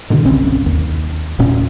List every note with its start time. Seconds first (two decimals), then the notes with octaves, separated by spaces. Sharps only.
0.10 G2 B2 D3 D#3
0.25 G1 C2 C4 C#4
0.66 D#2
1.39 E1 A#2 C#4